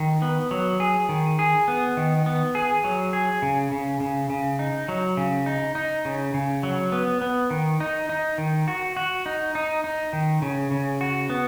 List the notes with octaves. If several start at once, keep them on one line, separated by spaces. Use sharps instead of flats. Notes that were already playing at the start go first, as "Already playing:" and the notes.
Already playing: D#3
B3
F#3
G#4
D#3
G#4
B3
D#3
B3
G#4
F#3
G#4
C#3
C#3
C#3
C#3
D#4
F#3
C#3
D#4
D#4
C#3
C#3
F#3
B3
B3
D#3
D#4
D#4
D#3
F#4
F#4
D#4
D#4
D#4
D#3
C#3
C#3
F#4
B3